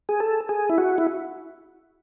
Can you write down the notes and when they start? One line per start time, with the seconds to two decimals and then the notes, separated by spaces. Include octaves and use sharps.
0.09 G#4
0.20 A4
0.49 G#4
0.70 E4
0.78 F#4
0.98 E4